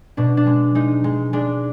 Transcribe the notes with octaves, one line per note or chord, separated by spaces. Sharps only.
B2 D4
D4
G#3
G#3 D#4
G#3
G#3 D4